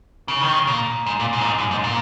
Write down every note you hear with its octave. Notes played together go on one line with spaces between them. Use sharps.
C#3
D#3
C#3
A#2
G#2
A#2
G#2
A#2
G#2
F#2
G#2
A#2